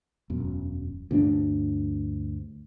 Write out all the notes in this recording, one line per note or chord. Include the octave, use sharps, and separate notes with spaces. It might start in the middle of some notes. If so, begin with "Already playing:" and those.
E1 F#2
D2 G2 C#4 D4